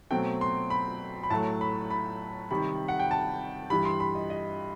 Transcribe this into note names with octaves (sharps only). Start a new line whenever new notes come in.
B2 F#3 A3 C4 G5
C6
B5
B5
A2 F#3 A3 A5
B5
B5
C3 D#3 G3 B5
F#5
G5
A5
G2 E3 G3 B5
C6
B5
D#5
D#5